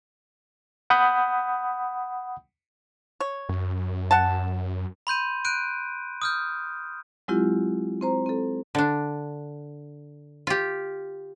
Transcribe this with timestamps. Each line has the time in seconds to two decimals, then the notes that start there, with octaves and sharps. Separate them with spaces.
0.90 F#5 B5 D#6 G6
3.20 C#5
3.49 F#2
4.11 F#5 A5
5.07 B5 C6 G6 D#7
5.45 F#6 G6 D7 D#7
6.22 D#6 F6 G6
7.28 F#3 G#3 C4 E4 F4 G4
8.01 C4 C5 A#5
8.26 C4 A4
8.75 D3 D4
10.47 F4 G4